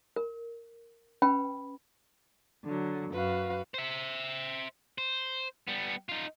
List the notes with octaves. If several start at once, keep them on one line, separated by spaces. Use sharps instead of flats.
A#4
C#4 B4 G5 B5
D3 F#3
F#2 F#4 B4 F5
C5 E5
C5
G3 B3
D#4 F4